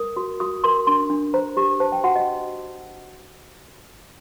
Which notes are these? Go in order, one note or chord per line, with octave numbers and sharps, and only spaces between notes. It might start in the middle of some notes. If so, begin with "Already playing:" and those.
Already playing: A#4 D#6
F#4
F#4 D#6
A#4 C6
D4 C6
D4
C5 A#5
G4
C5 A5
G5
F#4 F#5
D#5